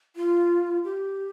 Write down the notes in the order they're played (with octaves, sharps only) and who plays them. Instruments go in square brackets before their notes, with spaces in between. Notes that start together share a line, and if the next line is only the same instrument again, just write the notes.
[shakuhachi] F4
G4